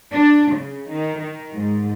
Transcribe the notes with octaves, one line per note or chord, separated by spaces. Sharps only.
D4
C#3
D#3
D#3
G#2